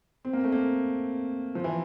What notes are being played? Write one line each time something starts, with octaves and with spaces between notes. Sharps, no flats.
C4
A#3
A3
A#3
F3
E3